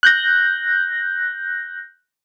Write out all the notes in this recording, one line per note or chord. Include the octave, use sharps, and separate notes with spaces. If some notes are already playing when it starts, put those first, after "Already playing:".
F#6 G6 A#6